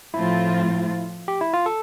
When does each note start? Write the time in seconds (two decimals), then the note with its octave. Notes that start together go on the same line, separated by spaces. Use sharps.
0.14 A2 F3 C4 E4 F4
1.28 G4
1.41 E4
1.54 F4
1.66 A4